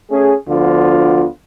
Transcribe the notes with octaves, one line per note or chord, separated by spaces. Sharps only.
A3 C#4 G#4
D2 D3 F3 B3 F4